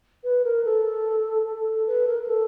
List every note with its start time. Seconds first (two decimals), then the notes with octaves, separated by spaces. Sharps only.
0.24 B4
0.44 A#4
0.65 A4
1.46 A4
1.87 B4
2.07 A#4
2.22 A#4
2.28 A4